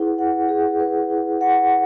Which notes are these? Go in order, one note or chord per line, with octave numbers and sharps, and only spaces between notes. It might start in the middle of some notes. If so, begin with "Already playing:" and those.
Already playing: E4 G#4 B4 F#5
F#5
G#4
B4
E4
F#5